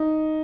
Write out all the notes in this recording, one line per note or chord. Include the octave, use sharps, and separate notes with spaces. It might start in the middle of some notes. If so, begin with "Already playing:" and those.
Already playing: D#4